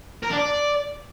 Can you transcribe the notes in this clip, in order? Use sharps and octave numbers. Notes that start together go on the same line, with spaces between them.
A#4
D4
D5